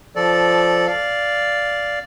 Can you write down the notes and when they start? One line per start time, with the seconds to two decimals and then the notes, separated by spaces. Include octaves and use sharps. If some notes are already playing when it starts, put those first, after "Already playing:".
0.16 F3 A4 D5
0.87 D5 F5